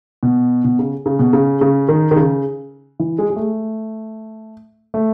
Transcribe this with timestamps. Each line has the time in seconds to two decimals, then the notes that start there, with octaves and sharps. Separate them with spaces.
0.23 B2
0.64 B2
0.79 C#3
1.06 C#3
1.19 B2
1.33 C#3
1.61 C#3
1.89 D#3
2.11 D#3
2.16 C#3
3.00 E3
3.19 G#3
3.30 G#3
3.36 A3
4.94 A3